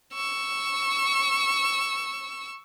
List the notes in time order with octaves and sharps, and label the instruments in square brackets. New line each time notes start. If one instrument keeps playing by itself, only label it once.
[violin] C#6 E6